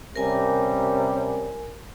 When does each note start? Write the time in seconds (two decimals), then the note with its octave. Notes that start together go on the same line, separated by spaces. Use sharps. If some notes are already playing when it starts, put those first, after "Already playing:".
0.16 C3 G3 C#4 A#4 G#5